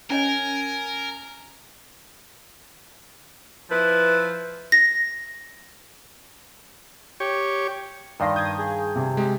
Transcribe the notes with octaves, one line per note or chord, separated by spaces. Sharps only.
C#4 A#4 C#5 D#5 G#5
F3 E4 B4
A#6
G4 C#5
G2 D#3 D5 F5 C6 A#6
D#6 G6 G#6
G#4
C3
G#3 G4